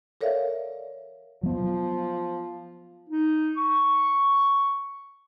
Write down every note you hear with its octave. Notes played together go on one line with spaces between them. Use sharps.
A4 A#4 C#5 D5 E5 F5
F3 F#3 B3
D#4
C#6